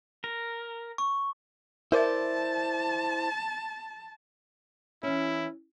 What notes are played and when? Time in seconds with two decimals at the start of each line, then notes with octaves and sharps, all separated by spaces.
0.24 A#4
0.98 C#6
1.92 E4 A#4 C5 D5 E5 A5
5.03 E3 C#4 E4